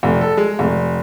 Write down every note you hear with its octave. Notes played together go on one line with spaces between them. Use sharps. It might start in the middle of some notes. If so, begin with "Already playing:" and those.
F1
A4
G#3
F1